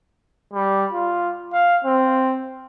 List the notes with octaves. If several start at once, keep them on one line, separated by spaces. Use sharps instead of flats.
G3
F4
F5
C4